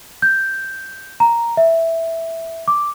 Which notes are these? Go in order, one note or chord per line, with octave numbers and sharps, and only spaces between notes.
G6
A#5
E5
D6